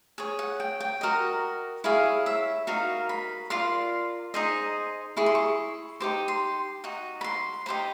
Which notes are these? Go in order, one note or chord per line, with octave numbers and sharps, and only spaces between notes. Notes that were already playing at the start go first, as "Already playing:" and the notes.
G#4 C#5
F#5
G5
G5
F#4 A#4 D#5
E4 G#4 C#5 F5
E5
D#4 F#4 A#4 F5
B5
F4 A#4 D5 C6
D#4 G#4 C5 D#5
E4 G#4 C#6
C6
C#6
D#4 G4 C5 D6
C6
D#4 F#4
B5
C6
D#4 G4 C5 B5